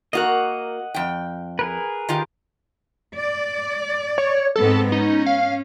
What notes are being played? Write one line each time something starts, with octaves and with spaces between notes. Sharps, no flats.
A#3 F#4 A#4 D#5 F#5
F2 G5
G#4 A#4 B4
D#3 F4 G4
D5
C#5
G#2 B3 C4 A4
C#4 D#4
F5